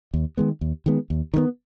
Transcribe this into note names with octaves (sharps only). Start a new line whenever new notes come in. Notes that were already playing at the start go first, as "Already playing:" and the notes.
D#2
D#3 G#3 B3
D#2
D#3 G#3 B3
D#2
D#3 G#3 B3